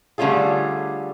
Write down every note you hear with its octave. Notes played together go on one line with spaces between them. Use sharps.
D3 G3 A3 C#4 F4 G#4